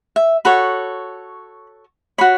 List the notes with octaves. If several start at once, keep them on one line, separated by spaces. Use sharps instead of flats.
E5
F#4 A4 C#5 B5
F#4 C#5 B5